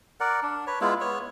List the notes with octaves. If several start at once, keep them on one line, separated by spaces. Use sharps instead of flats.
A#4 D5 F#5
D4
B4 C#5
G#3 B3 E4 F4
B3 C#5